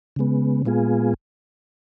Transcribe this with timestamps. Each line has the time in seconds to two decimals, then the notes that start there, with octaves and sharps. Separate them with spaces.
0.16 C#3 G#3 B3
0.66 A#2 G#3 B3 F4 G#4